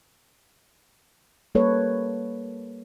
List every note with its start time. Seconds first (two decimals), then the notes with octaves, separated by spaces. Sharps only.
1.55 G3 A#3 A4 B4 C#5